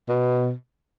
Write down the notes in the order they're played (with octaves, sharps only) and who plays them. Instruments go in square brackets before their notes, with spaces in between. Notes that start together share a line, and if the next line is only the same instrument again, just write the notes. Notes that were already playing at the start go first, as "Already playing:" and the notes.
[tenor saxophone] B2